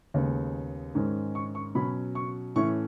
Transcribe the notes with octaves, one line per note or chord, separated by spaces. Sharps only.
D#2 C#3 G#3 B3
G#2 D#3 G#3 C#4
C#6
C#6
B2 F#3 C#4 B5
C#6
A2 E3 A3 C#4 C#6